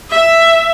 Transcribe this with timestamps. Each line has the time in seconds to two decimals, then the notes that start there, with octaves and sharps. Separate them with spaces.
0.10 E5